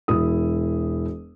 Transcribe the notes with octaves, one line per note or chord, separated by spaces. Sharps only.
E1 E4 D#6